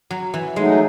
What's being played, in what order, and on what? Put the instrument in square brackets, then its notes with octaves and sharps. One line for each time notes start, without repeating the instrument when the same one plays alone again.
[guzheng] F#3
E3
[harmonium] F#3 A3 D#4 [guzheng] G#3